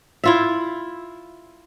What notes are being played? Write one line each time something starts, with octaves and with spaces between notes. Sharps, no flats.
E4 F4 E5